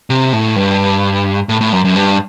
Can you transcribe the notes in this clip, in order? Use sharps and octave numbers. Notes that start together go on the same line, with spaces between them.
C3
A2
G2
A2
A2
F#2
F#2
G2